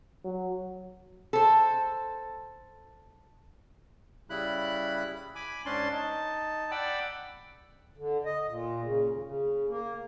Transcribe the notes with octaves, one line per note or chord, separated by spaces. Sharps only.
F#3
A4 C5
C#3 G3 E4 B5 F#6
G#5 B5 D6
G#2 C#4 D4 A5 C6
D#4 A5
D5 F#5 G5 B5 D6 E6
D3
D#5
A#2
C#3
D#2
C#3
A#3